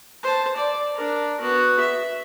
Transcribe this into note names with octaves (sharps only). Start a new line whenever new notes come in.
C5 A5
D5
D4 A#4
B3 F#4
E5